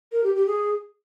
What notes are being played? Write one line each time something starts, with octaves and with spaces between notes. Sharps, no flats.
A#4
G4
G4
G#4